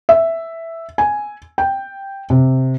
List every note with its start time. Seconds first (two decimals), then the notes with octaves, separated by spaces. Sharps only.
0.09 E5
0.98 G#5
1.58 G5
2.30 C3